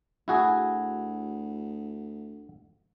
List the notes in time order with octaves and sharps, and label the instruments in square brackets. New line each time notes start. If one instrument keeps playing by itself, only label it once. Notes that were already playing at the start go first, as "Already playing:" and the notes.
[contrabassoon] D2 [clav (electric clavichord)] E4 F#4 G#4